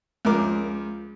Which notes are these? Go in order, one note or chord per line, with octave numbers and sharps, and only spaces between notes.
C#2 F3 A#4 D6